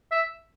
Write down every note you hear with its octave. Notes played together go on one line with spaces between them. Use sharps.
E5